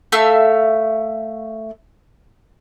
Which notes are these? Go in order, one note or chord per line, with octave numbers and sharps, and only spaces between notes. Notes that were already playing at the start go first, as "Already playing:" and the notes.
A3 E5 F5 E6